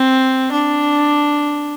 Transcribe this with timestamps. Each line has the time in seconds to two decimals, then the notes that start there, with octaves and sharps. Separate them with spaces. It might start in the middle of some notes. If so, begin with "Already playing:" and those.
Already playing: C4
0.52 D4